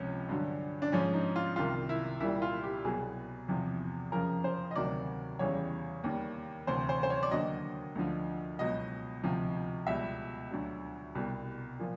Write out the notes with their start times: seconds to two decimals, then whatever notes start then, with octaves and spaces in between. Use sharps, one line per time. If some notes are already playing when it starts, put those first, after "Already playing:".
Already playing: C#2 C3 F3 C#4
0.29 G2 D3 F#3
0.82 D4
0.92 G#2 F3 C#4
1.14 D#4
1.36 F4
1.56 C2 C3 D#3 F4
1.89 E4
2.20 C2 A#2 G3 E4
2.42 F4
2.63 G4
2.84 C2 B2 F#3 G#4
3.48 E2 C3 F3
4.12 F2 C#3 F3 A#4
4.44 C5
4.71 D#5
4.75 D2 C3 D#3 F#3 D5
5.39 E2 C#3 E3 G3 C#5
6.04 D#2 D#3 G3
6.67 D2 C3 E3 C5
6.89 C5
7.03 C5
7.10 C#5
7.23 D5
7.31 D#2 D3 F#3 D#5
7.95 D2 D3 F3
8.59 C#2 B2 F#3 D#5
9.24 D2 C3 F3
9.87 C#2 B2 G3 E5
10.51 D2 D3 F#3
11.15 C2 B2 G3
11.79 A#2 F3